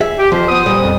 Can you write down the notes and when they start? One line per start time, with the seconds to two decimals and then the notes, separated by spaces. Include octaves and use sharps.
0.01 G#4 E5
0.19 G4
0.32 F2 F3 C5
0.49 B3 C5 D#6
0.66 A#2 G3
0.81 F2